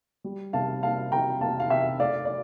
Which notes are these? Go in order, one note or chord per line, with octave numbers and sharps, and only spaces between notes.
G3
C3 F5 A5
A#3 F5 A5
C3 G5 A#5
A#3 F5 A5
F5
C3 E5 G5
A3 D5 F5
D5